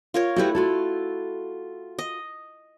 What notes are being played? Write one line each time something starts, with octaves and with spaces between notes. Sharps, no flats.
F4 A#4 C#5
A3 E4 F#4 G4 B4
F4 F#4 A4
D#5